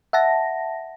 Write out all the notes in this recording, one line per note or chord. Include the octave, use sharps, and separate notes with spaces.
E5 F#5 A5 A#6